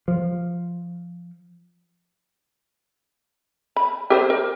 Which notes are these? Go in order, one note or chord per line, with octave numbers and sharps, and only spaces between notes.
F3
B5
G4 B4 C5
A#4